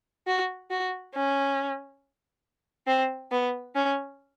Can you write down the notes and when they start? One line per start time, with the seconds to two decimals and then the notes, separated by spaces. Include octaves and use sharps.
0.27 F#4
0.71 F#4
1.15 C#4
2.87 C4
3.32 B3
3.75 C#4